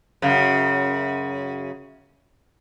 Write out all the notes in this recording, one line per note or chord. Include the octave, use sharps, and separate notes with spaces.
F#2 C#3